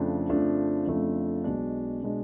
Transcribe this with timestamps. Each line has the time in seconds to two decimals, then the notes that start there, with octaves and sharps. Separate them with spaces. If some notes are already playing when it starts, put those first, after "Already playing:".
Already playing: F2 C#3 F3 A3 D4
0.29 F2 C#3 F3 A3 D4
0.87 F2 C#3 F3 A3 D4
1.44 B1 B2 G#3 D4
2.03 B2 G#3 D4